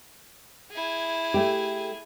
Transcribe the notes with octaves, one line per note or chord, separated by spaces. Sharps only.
E4 G#4
A3 G4